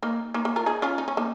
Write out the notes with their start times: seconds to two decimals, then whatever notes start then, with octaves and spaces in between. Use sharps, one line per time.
0.02 A#3 D#4
0.34 A#3 D#4
0.45 A#3
0.56 F4 A#4
0.66 D#4 G#4
0.82 C#4 F4
0.98 D#4
1.08 C#4
1.17 A#3 D#4